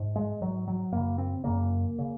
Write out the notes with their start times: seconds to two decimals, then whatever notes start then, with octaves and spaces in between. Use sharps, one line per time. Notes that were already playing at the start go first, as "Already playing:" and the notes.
Already playing: G#2
0.16 G#3
0.42 G#2 F#3
0.68 F#3
0.92 F#2 C#3 A#3
1.18 C4
1.44 F#2 C#3 A#3
1.98 C#3